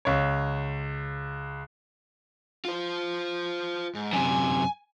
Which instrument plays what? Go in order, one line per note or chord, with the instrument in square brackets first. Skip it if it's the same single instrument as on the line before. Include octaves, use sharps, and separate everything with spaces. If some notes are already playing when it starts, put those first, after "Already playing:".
[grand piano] C#2 C#5
[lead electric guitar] F4 C5
G#2
[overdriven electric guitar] F#2 C3 [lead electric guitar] G#5